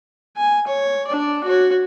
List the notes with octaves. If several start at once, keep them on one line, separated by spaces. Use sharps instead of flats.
G#5
C#5
D4 D5
F#4 C#5